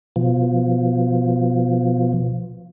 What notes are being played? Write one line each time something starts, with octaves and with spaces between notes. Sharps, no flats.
B2 F3